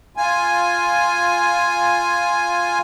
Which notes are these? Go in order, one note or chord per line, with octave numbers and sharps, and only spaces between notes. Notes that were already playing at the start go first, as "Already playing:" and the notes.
F4 G#5